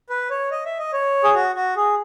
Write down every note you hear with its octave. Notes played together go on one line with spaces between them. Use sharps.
B4
C#5
D#5
E5
D#5
C#5
G#4
F#4
F#4
G#4